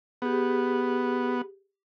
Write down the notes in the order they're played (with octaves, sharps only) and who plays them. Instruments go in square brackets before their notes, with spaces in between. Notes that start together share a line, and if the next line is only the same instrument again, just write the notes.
[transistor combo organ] B3 [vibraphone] G4 G#4